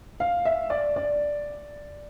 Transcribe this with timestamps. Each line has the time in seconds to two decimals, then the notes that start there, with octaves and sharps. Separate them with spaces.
0.20 F5
0.45 E5
0.70 D5
0.96 D5